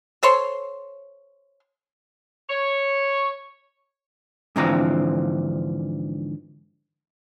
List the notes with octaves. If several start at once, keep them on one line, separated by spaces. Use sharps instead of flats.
A4 C5 C#5 C6
C#5
G#2 D3 E3 F3 C4 A#5